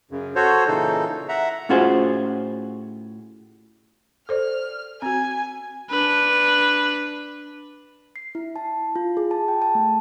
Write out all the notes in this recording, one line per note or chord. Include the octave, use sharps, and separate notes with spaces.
F#2 C#3
F#4 A4 C5 C#5
A#2 C#3 E3 D#4 A4
E5 F#5 A#5
A2 C#4 F4 F#4 G#4 C5
A4 C5 D5 F6
C4 F#4 G#5
D4 B4
C7
E4
A5
F4
G#4
A5
G5
A5
A3